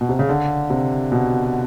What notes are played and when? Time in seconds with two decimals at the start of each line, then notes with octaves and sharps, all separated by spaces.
0.01 B2
0.09 C3
0.19 C#3
0.29 D3
0.70 C3
1.12 B2